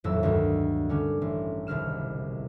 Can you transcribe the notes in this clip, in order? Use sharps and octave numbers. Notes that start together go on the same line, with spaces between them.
D#1 A1 F2 A2 F#3 E6
D2 G2 D#3
D3 G3 C#4
A1
E1 C2 D#3 F6 E7